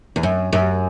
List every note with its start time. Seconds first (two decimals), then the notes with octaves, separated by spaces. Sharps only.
0.16 E2
0.23 F#2
0.53 F#2